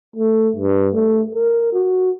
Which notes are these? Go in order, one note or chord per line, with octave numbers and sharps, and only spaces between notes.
A3
G2
A3
A#4
F#4